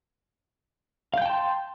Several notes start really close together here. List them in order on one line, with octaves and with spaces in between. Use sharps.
F5 G6 G5 A5 C6